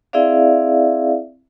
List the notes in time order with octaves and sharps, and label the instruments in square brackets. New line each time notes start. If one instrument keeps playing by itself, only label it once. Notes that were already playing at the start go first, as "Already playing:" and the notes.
[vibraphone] C4 E4 G#4 D5 E5 F5